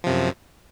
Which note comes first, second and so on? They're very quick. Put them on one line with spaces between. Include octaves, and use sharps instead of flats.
F3 C3 F#2